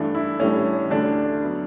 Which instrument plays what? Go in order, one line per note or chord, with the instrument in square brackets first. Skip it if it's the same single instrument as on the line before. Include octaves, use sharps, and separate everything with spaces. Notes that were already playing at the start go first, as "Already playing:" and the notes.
Already playing: [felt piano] G2 E3 A3 D4
[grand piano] E4
[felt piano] A2 E3 G3 D4 [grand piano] C#4
[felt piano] D2 D3 A3 [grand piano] D4
[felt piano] F#3 B3 E4